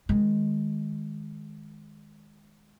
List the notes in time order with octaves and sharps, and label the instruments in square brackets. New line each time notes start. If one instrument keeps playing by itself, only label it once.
[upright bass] D#3 G#3